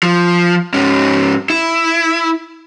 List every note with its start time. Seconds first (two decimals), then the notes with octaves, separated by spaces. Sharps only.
0.03 F3
0.74 G#2 C#4
1.50 E4